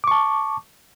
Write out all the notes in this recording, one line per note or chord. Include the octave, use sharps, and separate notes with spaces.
A5 C#6 D6